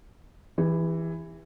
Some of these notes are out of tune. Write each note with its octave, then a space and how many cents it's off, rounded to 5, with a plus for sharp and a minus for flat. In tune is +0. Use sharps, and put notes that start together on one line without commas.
E3 +0 G4 +40